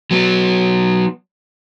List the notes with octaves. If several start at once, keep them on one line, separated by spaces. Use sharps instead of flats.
F#3 B3